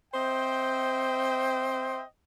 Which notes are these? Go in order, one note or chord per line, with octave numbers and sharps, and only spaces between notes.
C4 C5 D#5 E5 G5